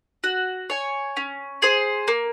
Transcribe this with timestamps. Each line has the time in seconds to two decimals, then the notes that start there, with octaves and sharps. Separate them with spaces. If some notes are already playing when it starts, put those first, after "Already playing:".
0.24 F#4
0.70 C#5 G#5
1.17 C#4
1.62 G#4 C5
2.08 A#3